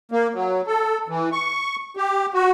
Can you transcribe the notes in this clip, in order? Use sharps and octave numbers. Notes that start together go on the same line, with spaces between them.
A#3
F#3
A4
E3
C#6
G4
F#4